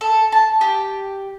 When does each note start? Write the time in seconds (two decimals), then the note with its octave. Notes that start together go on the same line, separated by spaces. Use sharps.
0.01 A4
0.32 A5
0.61 G4